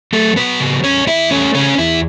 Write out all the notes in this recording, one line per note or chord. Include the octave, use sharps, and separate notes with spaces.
F#3 A3 A4
F#3 B3 B4
C#3
E2 C#4 C#5
E2 E4 E5
A3 C#4 C#5
C#3 C#4 C#5
E2 E4